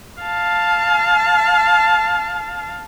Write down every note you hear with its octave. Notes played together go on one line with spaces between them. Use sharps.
F5 A5